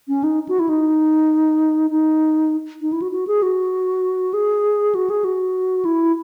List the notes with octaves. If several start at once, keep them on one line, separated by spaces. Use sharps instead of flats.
C#4
D#4
F#4
E4
D#4
D#4
D#4
E4
F#4
F#4
G#4
F#4
G#4
F#4
G#4
F#4
E4